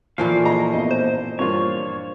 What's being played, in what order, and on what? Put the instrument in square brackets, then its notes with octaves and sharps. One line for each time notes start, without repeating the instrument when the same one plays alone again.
[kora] A#2 E3 F3 [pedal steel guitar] A3 A#3 F5
[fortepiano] G#4 D#5 A#5
A1 B3 D#5
[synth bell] C5
[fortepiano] G2 A#3 F4 [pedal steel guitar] C#5